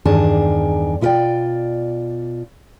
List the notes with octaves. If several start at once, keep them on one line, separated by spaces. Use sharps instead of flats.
E2 G2 D#3 D4 G#4 A5
B2 E4 F4 B4 D5 G5